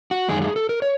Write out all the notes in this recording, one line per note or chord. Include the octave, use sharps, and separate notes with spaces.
F#4
F#2 D#3 G#3 G#4
G#4
A4
A#4
C#5